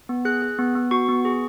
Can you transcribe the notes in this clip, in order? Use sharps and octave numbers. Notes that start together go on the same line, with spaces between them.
B3
G#4 F#6
G#4
B3
B3
F#4 C#6
B3
G#4